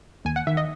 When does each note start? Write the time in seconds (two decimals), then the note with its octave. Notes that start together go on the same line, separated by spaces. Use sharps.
0.25 D#2 G#5
0.36 F#5
0.47 D#3 E5
0.57 D#5